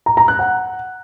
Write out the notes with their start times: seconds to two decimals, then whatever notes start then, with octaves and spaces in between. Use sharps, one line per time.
0.06 A#5
0.17 A#5
0.28 F#6
0.39 F#5